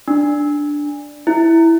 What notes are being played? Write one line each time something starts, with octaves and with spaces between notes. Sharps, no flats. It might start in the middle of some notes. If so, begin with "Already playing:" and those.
D4
E4